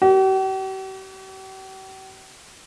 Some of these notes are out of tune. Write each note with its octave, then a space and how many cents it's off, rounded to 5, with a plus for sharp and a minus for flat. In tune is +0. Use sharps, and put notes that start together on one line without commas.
G4 -45